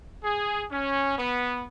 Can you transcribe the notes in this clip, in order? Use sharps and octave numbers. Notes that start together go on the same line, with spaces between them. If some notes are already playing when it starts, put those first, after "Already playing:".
G#4
C#4
B3